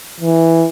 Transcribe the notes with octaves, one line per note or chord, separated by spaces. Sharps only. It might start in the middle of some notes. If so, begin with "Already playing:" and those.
E3